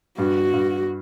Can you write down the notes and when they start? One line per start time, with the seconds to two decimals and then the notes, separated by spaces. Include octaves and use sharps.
0.18 G2 F#4
0.53 G2